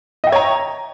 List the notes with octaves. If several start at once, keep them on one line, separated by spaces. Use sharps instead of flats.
C#5 D#5 E5 G5 A#5